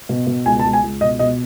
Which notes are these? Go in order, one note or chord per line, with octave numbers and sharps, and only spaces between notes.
B2
B2
C#2 G#5
A5
C#2
G#5
C#2
B2 D#5
B2 D#5